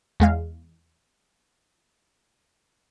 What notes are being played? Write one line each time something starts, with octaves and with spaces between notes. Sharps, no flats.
E2 G#3 F5